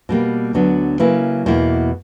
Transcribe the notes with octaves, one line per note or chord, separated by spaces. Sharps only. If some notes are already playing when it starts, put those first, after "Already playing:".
B2 G3 A#3
D2 D3 F#3 B3 D4
C#3 F#3 A#3 E4 B4
E2 B2 A#3 E4